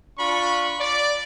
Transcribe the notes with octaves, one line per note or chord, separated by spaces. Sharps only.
D4 F4 B5 C#6
D5